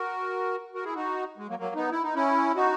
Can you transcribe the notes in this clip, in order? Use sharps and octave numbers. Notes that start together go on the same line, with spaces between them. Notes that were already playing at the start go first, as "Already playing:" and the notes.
Already playing: F#4 A#4
F#4 A#4
E4 G#4
D#4 F#4
G#3
F#3 A#3
F#3 A#3
B3 D#4
E4
D#4
C#4 E4
D#4 F#4